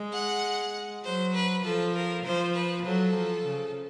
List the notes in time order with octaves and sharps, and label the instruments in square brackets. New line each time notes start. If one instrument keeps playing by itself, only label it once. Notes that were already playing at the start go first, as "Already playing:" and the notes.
Already playing: [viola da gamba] G#3
[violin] F#5
[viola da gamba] F#3 [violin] C5
[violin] B4
[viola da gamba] F3 [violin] A4
[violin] A#4
[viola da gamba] F3 [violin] C5
[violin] B4
[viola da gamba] F#3 [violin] A4
[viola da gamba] F3
C#3